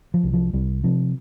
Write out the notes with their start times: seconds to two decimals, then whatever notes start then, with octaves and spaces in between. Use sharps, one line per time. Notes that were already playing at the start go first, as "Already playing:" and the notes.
0.14 F3
0.23 C2
0.34 F3
0.53 C2 G3
0.84 C3 F3